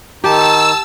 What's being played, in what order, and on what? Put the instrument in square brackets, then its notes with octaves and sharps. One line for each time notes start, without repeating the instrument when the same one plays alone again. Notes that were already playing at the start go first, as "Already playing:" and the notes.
[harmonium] D#3 D#4 [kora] G4 [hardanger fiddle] A5 [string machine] E6